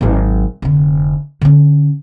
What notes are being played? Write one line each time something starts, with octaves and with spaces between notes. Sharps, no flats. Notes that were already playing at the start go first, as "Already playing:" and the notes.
G#1 F#3
F1 D3
D3 C#4